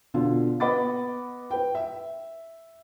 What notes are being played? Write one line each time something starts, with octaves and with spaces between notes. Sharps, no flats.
B2 D3 F4
B3 D#5 F#5 B5 D6 A6
B4 G5
E5